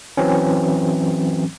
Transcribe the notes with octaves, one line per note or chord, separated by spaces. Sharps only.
E3 F#3 C4 C#4